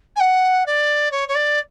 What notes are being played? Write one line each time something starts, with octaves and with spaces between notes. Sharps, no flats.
G#5
F#5
D5
C#5
C#5
D5